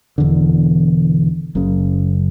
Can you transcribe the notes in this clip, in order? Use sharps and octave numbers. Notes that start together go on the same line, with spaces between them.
E1 E2 D3
F#1 F#2 C#3